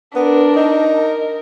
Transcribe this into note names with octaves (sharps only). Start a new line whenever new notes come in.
B3 D4 A#4
D#4
A#4